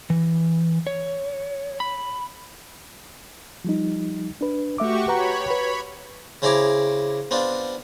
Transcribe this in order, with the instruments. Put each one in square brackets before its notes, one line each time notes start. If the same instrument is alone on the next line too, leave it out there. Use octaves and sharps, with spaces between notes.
[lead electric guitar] E3
C#5
B5
[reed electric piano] F3 G3 D#4
D4 B4
[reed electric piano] A3 E5 D6 [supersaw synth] F#4 G4 C#6
[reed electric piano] B4 F#5 A#5 [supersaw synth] C#5 B5
[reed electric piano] B4
[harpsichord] C#3 C4 E4 G#4 A#5 D6
B3 C4 D4 F4